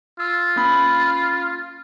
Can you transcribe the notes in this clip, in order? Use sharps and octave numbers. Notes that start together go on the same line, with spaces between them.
F4 E6
A#3 C#4 B5